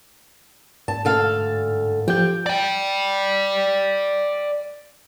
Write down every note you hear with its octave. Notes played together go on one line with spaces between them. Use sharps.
G#2 A5
D2 A4 F5
F3 G4 G6
D5 G5